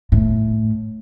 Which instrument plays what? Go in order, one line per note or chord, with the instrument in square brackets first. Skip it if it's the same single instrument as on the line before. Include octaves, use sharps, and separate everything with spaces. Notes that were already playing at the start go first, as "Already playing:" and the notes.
[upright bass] A2